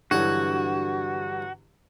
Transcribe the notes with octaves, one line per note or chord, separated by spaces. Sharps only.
G2 D3 E3 F#3 F#4 C#5 F#5